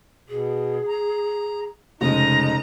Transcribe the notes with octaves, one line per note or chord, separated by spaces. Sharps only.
B2 G#4
A#5
F1 C#3 G#3 D#4 D#5 A#5